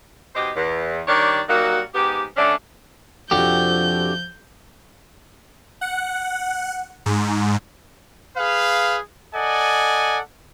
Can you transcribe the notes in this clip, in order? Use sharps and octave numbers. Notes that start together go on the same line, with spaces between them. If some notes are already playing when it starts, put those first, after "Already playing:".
B2 D#4 G4 C5 D#5
E2
D#3 G3 D4 C#5 D5
F#3 G3 A#3 D#4 F#4
G#2 B3 G4
D3 A3 C#4 D4
F2 C3 F3 D4 F#4 G4 G6
F#5
G#2
G#4 B4 F5
A4 D5 D#5 F#5 G#5